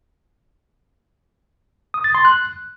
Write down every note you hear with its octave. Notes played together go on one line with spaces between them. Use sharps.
D#6
A6
C6
F#6